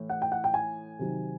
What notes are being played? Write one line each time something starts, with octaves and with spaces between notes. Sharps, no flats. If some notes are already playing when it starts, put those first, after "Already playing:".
Already playing: A2 E3
F#5
G5
F#5
G5
G#5
C3 D#3 F#3